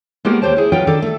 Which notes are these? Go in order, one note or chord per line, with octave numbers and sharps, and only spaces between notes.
G#3 A#3 B3 F#4 G4 A#4
D#2 G4 C5 C#5 A5
E4 G#4
F3 F#3 C#4 F4 B4 G5
D#3 D4 A4
A3 A4